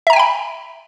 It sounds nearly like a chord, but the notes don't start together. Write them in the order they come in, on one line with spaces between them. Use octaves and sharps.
E5 A#5 G#5 G5 B5